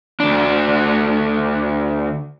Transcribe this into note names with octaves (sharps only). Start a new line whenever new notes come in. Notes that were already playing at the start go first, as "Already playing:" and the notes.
D2 D4